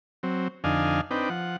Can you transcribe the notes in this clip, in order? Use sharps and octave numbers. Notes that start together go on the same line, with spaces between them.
F#3 C4
F2 D3 D4 D#4 F5 G#5
C4 D4 D#4 B4 G5
F3 F#5